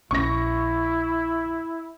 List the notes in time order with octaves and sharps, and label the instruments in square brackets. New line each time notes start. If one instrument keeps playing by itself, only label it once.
[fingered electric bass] A#1 C#4 [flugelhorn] E4 [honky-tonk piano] C#6 A#6